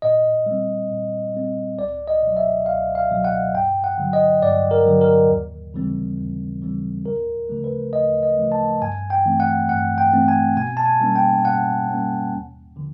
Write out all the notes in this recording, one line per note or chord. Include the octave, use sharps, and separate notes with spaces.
A#2 D#5
G3 C4
A#2
G3 C4
C#2 D5
D#5
B2 F#3
E5
C#2 F5
F5
B2 F#3
F#5
G2 G5
F#5
D3 F#3
D#5
G2 D5
A#4
D3 F#3
A#4
D#2
C#3 E3 G3 C4
D#2
C#3 E3 G3 C4
D2 A#4
C#3 F3 A3
B4
D2 D#5
D#5
C#3 F3 A3
A5
G2 G#5
G5
E3 A3 C4
F#5
G2 F#5
G5
E3 A3 C4
G#5
B2 G#5
A5
G#5
G3 A#3 C#4
G5
B2 F#5
G3 A#3 C#4
D#2
D3 F3